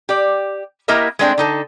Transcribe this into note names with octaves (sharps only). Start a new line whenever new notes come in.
G4 D5
A#3 E4 G4 A#4 D#5 E5
G#3 A3 C4 D4 B4 G5
D3 D#4 A4